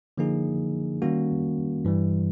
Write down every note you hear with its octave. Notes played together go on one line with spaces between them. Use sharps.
D3 F3 A#3 D#4 G#4
D#3 G3 A#3 C#4 F#4
G2 E3 G3